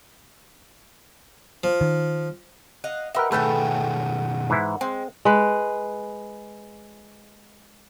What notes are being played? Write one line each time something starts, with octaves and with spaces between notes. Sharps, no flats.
F3
D#3
D#5 F5 F#5
D#4 G4 A#4 B4 E5 F#5
B2 D#3 A3 G#4 A4 B4 C#5 G5
G#2 E3 E4
G#3 C4
G#3 B4